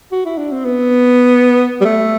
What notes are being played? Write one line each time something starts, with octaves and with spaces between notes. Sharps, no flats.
F#4
E4
D4
C4
B3
G3
A3